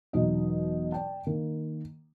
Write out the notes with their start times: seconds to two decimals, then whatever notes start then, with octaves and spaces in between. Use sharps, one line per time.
0.13 E1 B2 F#3 D#4 D#5
0.92 D5 G5 A5
1.26 D#3 A#3